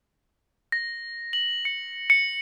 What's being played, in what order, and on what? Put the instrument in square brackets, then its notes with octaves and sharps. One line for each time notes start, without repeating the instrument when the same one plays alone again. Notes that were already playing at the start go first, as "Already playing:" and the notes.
[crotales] A#6
F#7
C#7
C#7